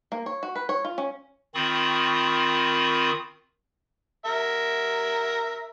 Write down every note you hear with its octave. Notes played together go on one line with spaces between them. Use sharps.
A#3
C#5
F#4
B4
C#5
F4
C#4
D#3 C4 F4 B5 C#6 D#6
A#4 E5